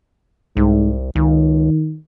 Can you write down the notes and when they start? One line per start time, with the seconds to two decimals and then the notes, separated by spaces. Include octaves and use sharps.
0.57 C2 G#2
1.16 C#2 D#3